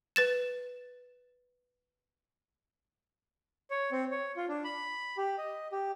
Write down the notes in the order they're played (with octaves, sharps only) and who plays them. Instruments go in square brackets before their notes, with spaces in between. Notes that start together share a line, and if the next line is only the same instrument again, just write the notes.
[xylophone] B4 A6 E7
[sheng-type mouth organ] C#5
C4
C#5
F4
D4
B5
G4
D#5
G4